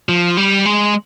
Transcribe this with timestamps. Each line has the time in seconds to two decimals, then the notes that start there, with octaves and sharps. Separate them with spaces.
0.09 F3
0.37 G3
0.65 G#3